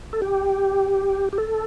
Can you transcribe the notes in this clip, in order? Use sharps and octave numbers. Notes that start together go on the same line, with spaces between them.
A4
G4
G4
A4